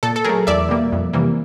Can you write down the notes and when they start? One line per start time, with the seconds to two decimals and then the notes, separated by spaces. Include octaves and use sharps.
0.03 A#2 A4
0.16 A4
0.24 F#3 A3 G#4 A#4
0.47 E2 D5 E5
0.69 B2 G3 A#3
0.92 F2
1.13 C3 E3 G3 A#3